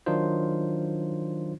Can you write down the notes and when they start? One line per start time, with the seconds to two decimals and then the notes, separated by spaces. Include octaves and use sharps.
0.06 D#3 F#3 D4 D#4 F4 C5